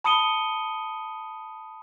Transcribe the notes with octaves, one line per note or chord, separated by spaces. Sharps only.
A5 B5 D#6 C#7 D#7 G7